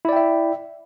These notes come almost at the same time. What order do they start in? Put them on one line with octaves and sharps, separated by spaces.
E4 D5 G5 E5